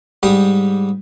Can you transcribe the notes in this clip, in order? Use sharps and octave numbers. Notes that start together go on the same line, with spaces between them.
G#2 G3 G4 D#6